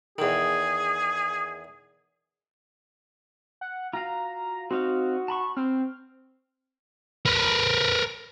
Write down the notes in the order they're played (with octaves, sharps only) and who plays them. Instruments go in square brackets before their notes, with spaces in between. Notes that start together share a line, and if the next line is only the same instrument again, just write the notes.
[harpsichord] E2 D#3 [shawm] G#4
[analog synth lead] F#5
[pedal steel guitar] F4 F#4 F5 [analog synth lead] A#5
[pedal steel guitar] C4 D#4 F5 [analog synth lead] F#4
[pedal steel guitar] A5 B5 C#6
[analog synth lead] C4 [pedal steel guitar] F6
[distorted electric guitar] A#4 B4